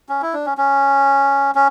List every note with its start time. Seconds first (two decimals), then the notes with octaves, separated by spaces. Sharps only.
0.09 C#4
0.22 E4
0.33 D4
0.46 C#4
0.58 C#4
1.55 C#4